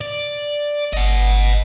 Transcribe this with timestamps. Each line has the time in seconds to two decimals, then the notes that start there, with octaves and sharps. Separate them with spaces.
0.01 D5
0.93 G1 D#5 F#5